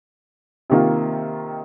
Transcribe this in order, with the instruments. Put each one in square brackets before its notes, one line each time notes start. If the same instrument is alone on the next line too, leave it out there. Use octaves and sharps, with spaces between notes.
[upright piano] C3 D#3 A#3 F4